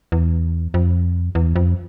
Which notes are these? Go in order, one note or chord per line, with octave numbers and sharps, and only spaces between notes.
E2
F2
E2
F2